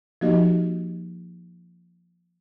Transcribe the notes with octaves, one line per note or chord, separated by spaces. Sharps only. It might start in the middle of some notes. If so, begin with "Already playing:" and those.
F3 A#3 D#4 F#4 G4 D#5